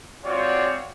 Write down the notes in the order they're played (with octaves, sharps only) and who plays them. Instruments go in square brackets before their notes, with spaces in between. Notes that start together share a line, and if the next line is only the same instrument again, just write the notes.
[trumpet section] G#3 C4 F4 F#4 C#5 D5